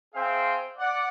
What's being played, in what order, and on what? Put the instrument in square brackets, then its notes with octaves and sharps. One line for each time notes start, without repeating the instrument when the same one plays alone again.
[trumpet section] C4 G#4 C5 E5 F5 G5
D5 F#5